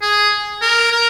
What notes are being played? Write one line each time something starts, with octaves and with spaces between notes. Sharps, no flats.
G#4
A#4
A#4